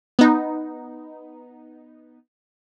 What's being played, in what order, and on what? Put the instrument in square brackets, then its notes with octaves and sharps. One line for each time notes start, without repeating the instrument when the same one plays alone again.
[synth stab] B3 D#4